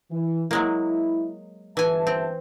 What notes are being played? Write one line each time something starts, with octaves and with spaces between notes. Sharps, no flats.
E3
F#3 G#3 A#3 E4
G1 E3 E5 G#5 A5
C4